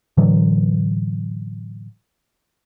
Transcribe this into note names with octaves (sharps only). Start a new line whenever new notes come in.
A2 D3 E3 F#3